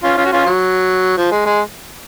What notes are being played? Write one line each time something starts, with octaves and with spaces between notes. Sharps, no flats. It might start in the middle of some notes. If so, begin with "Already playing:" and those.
C#4 F4
C#4 F4
F#4
C#4 F4
F#3
F3
G#3
G#3